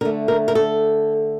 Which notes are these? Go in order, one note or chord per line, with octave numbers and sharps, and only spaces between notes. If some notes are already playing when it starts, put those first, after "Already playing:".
D3 A3 A#4
A#4
A#4
A4